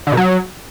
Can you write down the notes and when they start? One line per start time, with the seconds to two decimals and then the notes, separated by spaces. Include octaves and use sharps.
0.07 D3
0.12 B2
0.17 F#3